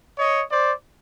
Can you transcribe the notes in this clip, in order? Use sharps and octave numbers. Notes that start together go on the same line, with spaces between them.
C#5 D#5
C5 D5